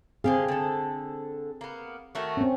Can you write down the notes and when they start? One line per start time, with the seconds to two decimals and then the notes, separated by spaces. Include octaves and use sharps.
0.24 D3 C4 G4 G#4 F5
0.49 D3 A4
1.61 A#3 B3
2.15 D#3 A3 F#4
2.37 C4 C#4